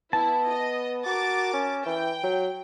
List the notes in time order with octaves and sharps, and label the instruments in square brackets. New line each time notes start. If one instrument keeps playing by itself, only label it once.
[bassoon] B3 [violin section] E4 [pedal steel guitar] A5
[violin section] D#5
[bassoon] F#4 [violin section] A#4 D6 A6
[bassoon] C#4
[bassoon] E3 [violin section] G5
[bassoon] F#3